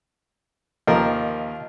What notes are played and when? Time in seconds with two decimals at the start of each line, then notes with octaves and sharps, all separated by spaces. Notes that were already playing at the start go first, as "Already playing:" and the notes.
0.88 D#2 F3 A#4 D#5 F5